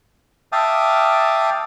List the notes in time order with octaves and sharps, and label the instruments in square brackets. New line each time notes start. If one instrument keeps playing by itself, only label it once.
[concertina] E5 F5 G5 A5 D6 D#6